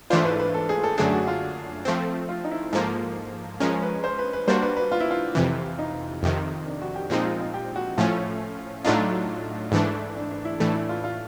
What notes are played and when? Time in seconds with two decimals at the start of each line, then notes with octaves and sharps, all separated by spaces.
0.10 G#2 E3 A3 D4 F4 C5
0.25 B4
0.39 B4
0.54 A4
0.69 G#4
0.84 A4
0.98 F#2 D3 F#3 A3 D4 G#4
1.13 F#4
1.27 F4
1.85 F3 A3 C4
2.29 F4
2.44 D#4
2.51 E4
2.73 G#2 F3 A#3 A4
3.60 F3 G#3 C#4 A#4
3.82 B4
4.04 C5
4.19 B4
4.33 B4
4.48 G3 A#3 D4 F#4 C5
4.62 B4
4.77 B4
4.91 F4
5.00 E4
5.11 F4
5.35 F2 C3 E3
5.79 D#4
6.23 F2 C3 D#3
6.66 D4
6.82 F#4
6.95 G4
7.10 A#2 F3 G#3 C4 D#4
7.25 F4
7.39 F4
7.54 G4
7.76 F#4
7.98 A2 F3 A3 C#4 F4
8.85 A2 F#3 A3 D4 D#4 F4
9.72 G#2 E3 A3 D4
10.16 D4
10.31 D4
10.45 E4
10.60 A2 E3 A3 D4
10.75 E4
10.89 F4
11.04 F4